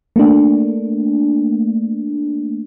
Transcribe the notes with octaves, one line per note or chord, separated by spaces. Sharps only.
A3 A#3 D4